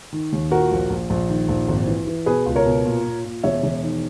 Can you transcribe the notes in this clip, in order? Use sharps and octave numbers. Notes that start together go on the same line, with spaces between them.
D#3
D#2
A#2 F#4 A#4
A#1
A#1
A#1
D#3
A#1
G#1
E3
E3
B2 G#4 B4
C#2
A#4 C#5
B2
A#2
A#2
A#2
E1 C#5 E5
E1
D#3